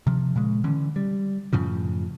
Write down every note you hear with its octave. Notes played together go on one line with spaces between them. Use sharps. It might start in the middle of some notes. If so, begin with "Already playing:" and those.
C3 F3
A#2 C#3 G#3
D3 E3 C#4
G3
F#2 A2 C#3 F3